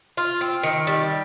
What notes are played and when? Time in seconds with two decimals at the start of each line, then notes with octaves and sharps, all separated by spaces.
0.17 F4
0.41 C4
0.63 D#3
0.87 G3